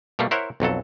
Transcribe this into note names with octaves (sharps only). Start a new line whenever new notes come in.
B2 G3 A3 A#3
E4 A#4 C5 C#5 E5 F#5
B1 F2 F#3 A4